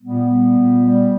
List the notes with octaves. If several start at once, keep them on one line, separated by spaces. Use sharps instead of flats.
A#2 G3 B3
G3
A#2
G3